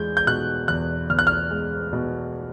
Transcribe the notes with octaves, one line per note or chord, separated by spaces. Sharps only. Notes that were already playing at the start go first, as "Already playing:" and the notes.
Already playing: E2 G#3 G6
G6
B2 F#6
E2 F#6
E2 F6
F#6
F6
G#3
B2